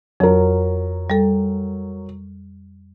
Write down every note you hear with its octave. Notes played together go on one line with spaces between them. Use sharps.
F2 F#3 A#4
G3 A4